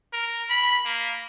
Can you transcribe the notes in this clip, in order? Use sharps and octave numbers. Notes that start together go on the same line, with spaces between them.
A#4
B5
A#3